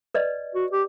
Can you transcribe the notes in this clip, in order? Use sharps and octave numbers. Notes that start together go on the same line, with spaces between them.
B4 D5 D#5
F#4
G4